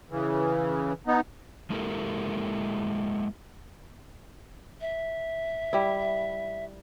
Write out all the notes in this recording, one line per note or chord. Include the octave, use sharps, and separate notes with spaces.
C#3 E3
B3 D#4
G#3 A#3 E4 G4 A4 A#4
E5
G3 E4